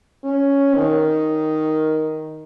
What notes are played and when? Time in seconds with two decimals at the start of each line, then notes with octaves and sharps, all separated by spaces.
0.24 C#4
0.75 D#3